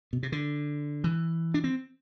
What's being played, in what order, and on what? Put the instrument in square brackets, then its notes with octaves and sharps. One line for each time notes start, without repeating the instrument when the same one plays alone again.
[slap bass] B2
C3
D3
E3
D4
C4